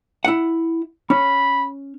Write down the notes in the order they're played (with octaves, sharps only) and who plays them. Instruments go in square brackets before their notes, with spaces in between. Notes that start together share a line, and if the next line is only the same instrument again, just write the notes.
[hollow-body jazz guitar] E4 F#5
[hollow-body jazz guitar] C#4 [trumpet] B5